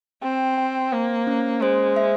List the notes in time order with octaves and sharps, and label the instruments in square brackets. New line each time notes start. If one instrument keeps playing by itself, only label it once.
[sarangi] C4 [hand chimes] G5
[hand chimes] G5
[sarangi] A#3 [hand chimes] C5
[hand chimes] C#4
[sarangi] G#3 [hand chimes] C5
[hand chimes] E5